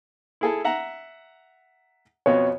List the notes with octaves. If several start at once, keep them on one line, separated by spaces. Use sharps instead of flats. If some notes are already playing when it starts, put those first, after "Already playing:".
E4 G#4 A4
E5 F#5 A#5
F2 B2 C#5